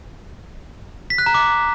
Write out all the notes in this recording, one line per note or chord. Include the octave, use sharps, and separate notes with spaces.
B6
F#6
A#5
D6